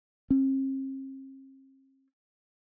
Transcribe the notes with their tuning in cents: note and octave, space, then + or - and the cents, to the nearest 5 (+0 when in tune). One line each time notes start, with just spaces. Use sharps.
C4 +45